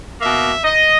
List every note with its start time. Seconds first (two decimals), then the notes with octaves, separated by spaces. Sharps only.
0.21 B2 A#3 E5
0.64 D#5